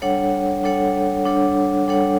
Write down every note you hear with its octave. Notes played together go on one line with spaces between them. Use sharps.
G3 D4 A4 C#5 F#5
G3 D4 A4 C#5 F#5
G3 D4 A4 C#5 F#5
G3 D4 A4 C#5 F#5